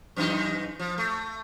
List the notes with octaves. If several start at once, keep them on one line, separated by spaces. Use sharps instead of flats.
F#2 E3 D#4
F3
A3